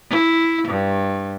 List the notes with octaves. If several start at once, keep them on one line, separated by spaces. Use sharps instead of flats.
E4
G2